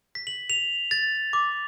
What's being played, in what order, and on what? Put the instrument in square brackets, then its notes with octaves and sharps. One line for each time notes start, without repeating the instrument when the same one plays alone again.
[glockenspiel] B6
F#7
F7
A6
D6